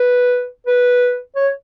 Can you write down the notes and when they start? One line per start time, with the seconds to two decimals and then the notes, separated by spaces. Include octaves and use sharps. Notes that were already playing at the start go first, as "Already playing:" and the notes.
Already playing: B4
0.67 B4
1.36 C#5